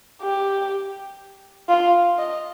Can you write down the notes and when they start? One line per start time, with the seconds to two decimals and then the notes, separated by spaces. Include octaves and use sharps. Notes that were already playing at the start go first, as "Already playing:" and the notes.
0.22 G4
1.69 F4
2.18 D#5